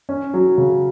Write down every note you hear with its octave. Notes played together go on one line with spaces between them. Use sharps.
C#4
F#3
C#3